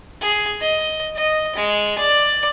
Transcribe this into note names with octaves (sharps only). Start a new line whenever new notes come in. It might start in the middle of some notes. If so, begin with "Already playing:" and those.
G#4
D#5
D#5
G#3
D5